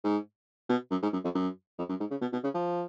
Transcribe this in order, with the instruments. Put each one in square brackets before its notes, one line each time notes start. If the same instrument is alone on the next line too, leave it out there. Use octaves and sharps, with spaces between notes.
[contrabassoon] G#2
B2
F#2
G#2
F#2
F2
F#2
F2
F#2
G#2
C#3
B2
B2
C#3
F3